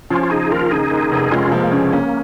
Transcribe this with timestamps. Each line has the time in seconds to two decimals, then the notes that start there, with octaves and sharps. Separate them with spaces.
0.10 F3 C#4 F4
0.23 F4
0.30 C#3 D#4 G#4
0.51 D#2 F4 A#4
0.71 C#3 D#4 G#4
0.91 D#2
1.11 F1
1.31 G#3 C#4 F4
1.52 F3 A#3
1.71 C#3 C#4
1.93 A#3 C#4